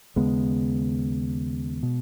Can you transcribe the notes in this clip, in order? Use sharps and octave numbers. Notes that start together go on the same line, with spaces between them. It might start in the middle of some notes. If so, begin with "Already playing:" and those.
D#2 C#3 G#3 B3
B2